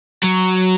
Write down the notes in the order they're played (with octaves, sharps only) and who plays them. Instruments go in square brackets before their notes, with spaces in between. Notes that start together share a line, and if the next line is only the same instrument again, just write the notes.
[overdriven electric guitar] F#3